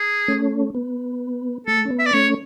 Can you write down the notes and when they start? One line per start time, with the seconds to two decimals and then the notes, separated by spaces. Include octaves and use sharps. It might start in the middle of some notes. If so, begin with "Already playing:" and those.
Already playing: G#4
0.28 A3 C#4
0.75 B3
1.67 A3 A4
1.85 C#4
1.90 B3
1.99 E5
2.06 D5
2.13 A3 C#4 C#5